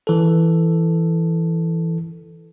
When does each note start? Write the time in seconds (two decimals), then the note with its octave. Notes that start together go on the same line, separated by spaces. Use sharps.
0.07 E3 A4